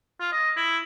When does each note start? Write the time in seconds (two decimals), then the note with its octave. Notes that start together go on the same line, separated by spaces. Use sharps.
0.20 F4
0.32 D#5
0.56 E4